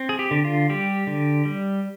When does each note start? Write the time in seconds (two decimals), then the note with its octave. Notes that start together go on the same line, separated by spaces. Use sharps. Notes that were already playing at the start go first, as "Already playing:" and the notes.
Already playing: C4
0.09 G#4
0.19 G4
0.31 D3
0.45 F4
0.70 G3 G4
1.07 D3
1.45 G3